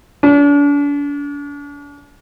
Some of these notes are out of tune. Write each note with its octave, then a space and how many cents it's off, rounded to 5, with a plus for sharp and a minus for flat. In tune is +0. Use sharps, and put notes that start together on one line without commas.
D4 -40